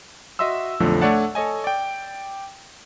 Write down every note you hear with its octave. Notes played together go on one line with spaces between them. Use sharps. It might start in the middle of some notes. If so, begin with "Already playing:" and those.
F#4 D#5 E5 C6 E6
B1 F2 D3 F3 A3
A3 D4 C#5 D5 F#5 A5
A4 C#5 D#5 G#5
D5 G5